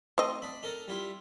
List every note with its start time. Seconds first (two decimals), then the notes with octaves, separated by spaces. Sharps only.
0.18 A3 C4 D#5
0.42 D4 B5
0.63 D#4 A4 A#4
0.88 G3 E4 F4